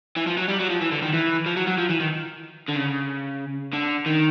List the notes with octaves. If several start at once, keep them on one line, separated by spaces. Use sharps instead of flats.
E3
F3
F#3
G3
F#3
F3
E3
D3
D#3
E3
F3
F#3
F#3
F3
E3
D#3
D3
C#3
D3
D#3